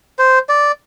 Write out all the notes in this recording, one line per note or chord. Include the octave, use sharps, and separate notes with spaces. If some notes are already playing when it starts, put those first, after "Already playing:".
C5
D5